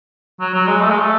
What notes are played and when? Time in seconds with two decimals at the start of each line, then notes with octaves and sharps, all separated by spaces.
0.40 F#3
0.54 F#3
0.68 G#3
0.81 A3
0.90 G#3
1.00 A3